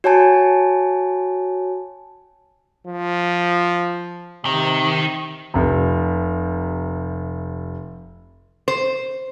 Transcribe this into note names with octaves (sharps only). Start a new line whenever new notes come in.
F#4 C#5 G#5 A5
F3
C3 D#3
F1 C3
C5